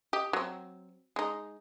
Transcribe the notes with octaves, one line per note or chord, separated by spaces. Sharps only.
G4 D#5
F#3 C4
G#3 D#4